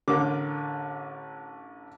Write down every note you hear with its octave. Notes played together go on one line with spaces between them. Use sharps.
A1 D3 A#4 D6